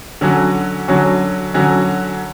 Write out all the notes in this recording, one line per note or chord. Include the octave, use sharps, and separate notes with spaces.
D3 F#3 C#4 F#4
D3 F#3 C#4 F#4
D3 F#3 C#4 F#4